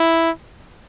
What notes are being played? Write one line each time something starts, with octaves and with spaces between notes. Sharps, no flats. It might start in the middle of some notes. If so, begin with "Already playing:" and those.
Already playing: E4